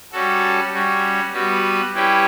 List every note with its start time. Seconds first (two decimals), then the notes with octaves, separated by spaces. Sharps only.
0.12 G3 C#4 F#4 A4
0.72 G3 C#4 F#4
1.33 G3 B3 F#4 B4
1.94 G3 C#4 E4 G4 B4